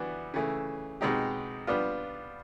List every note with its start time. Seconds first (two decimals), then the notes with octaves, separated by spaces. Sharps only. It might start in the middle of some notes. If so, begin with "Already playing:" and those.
Already playing: E3 G3 B3 D4 F#4
0.34 C#3 E3 A3
1.01 B2 G#3 C4 D#4 G4
1.67 G3 B3 D4 F4